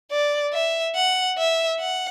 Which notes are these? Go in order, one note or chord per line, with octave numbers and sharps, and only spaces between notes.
D5
E5
F#5
E5
F#5